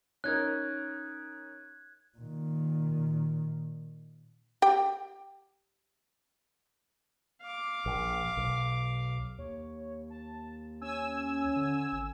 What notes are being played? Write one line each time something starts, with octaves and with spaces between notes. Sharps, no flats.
C#4 D#4 A#4 F#6 G#6
A#2 D#3
G4 G5
F5 D6
A#1
B1
D#2 C#5
A5
C#4 G#5 E6
D3
G#1